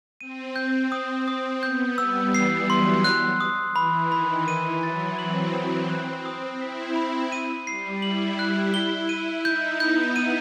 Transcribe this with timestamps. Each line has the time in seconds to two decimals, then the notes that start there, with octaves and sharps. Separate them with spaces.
0.20 C4 D#7
0.56 G6
0.92 D#6
1.28 D#6
1.62 B3 G6
1.98 G3 E6
2.34 E3 C7
2.70 F#3 C6
3.04 F#6
3.40 D#6
3.76 E3 B5
4.12 D#3 B5
4.47 E3 D#7
4.82 F#3 A6
5.18 C4 F#7
5.54 C4 D#6
5.89 F#6
6.26 D#6
6.60 E4 B6
6.96 B5
7.32 D#7
7.67 G3 C7
8.02 E4 F#7
8.39 F#6
8.74 G7
9.09 D#7
9.45 D#4 G6
9.80 B3 G6
10.16 D#7